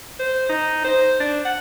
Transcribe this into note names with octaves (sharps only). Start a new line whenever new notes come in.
C5
D#4
C5
D4
F#5